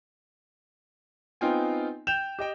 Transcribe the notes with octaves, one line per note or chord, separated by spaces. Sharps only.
B3 C4 D#4 F4 G5 G#5
G5 G6 E7 F7
G4 D#5 G5